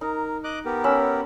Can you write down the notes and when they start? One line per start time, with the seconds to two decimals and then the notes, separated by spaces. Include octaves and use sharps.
0.01 D#4 A#4
0.44 D#5 D6 F#6
0.65 B3 G4 A#4
0.84 C#4 B5 E6